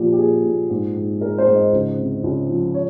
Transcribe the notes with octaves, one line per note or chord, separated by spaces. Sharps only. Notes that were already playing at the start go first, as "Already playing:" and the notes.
Already playing: A#2 F3 G4
G4
A#2 G#4
A#2
G#2
G#2
G#3 A#4
C5
G#2
D#5
C#2
C3
C#2
F3
C#5